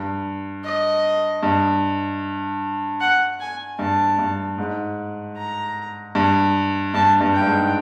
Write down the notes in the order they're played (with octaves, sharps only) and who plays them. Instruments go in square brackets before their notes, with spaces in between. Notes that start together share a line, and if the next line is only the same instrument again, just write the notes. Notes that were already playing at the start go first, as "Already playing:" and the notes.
Already playing: [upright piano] G2
[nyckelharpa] D#5
[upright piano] G2
[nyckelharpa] F#5
G#5
[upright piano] G2 [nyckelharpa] A5
[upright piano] G2
G#2
[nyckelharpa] A#5
[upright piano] G2
[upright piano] G2 [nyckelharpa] A5
[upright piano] G2
[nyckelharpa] G5
[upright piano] G2
G#2